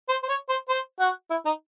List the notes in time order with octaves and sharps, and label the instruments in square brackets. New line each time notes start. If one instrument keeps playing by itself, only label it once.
[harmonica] C5
C5
C#5
C5
C5
F#4
E4
D#4